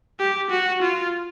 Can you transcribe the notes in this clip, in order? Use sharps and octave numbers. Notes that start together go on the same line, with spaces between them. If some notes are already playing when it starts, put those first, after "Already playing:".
G4
F#4
F4